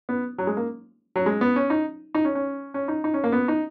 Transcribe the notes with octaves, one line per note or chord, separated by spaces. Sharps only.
B3
F#3
G#3
A#3
F#3
G#3
B3
C#4
D#4
D#4
C#4
C#4
C#4
D#4
D#4
C#4
A#3
B3
D#4